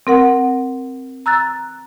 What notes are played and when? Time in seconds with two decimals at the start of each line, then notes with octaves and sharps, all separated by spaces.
0.07 C4 A#4 F#5
1.26 A#5 E6 F#6 A6